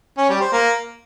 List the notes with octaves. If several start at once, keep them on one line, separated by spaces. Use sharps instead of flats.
C#4
G3
C5
A#3